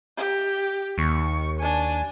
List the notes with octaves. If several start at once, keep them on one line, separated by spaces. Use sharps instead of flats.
G4
D#2 C#6
D4 G#5